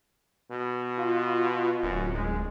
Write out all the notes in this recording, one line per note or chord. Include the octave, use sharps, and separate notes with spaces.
B2
F4
D1 F#2
G#3